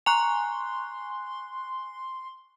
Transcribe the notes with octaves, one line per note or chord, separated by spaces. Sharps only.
G#5 A#5 C6 C#6 F#6 F7